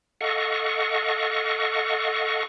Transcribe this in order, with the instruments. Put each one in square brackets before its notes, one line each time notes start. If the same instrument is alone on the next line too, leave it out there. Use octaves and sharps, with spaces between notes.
[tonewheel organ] A4 D#5 F5 F#5 C#6